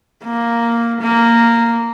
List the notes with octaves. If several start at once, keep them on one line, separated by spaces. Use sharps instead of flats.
A#3
A#3